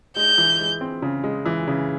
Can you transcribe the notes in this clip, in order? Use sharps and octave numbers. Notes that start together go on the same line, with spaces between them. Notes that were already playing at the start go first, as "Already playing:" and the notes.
G#3 G6
E3
G#3
C4
C#3
G#3
E3
C#3